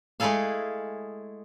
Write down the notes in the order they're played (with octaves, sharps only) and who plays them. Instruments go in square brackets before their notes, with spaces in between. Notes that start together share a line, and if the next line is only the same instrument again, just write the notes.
[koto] G#3 A3 E4 G#4 A4 F5